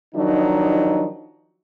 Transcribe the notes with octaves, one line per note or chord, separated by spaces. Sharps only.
D#3 F3 F#3 D4 D#4